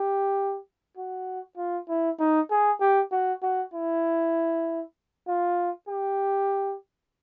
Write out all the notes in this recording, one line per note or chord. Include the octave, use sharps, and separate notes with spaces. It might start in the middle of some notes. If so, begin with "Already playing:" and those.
Already playing: G4
F#4
F4
E4
D#4
G#4
G4
F#4
F#4
E4
F4
G4